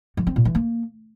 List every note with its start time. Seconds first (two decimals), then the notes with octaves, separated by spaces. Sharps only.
0.17 F3
0.27 C4
0.36 A#2
0.45 E3
0.55 A#3